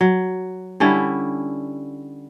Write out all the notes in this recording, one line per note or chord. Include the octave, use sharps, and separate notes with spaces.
F#3
D3 G3 C#4 E4